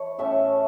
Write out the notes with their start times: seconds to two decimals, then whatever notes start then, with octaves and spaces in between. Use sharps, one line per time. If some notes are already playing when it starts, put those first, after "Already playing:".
Already playing: E3 A4 C#5
0.18 A2 A3 C#4 E5 A5